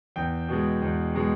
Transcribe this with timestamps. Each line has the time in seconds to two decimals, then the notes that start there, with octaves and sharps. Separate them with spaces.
0.16 E2 G5
0.49 B2 G#3
0.82 E2
1.15 B2 G#3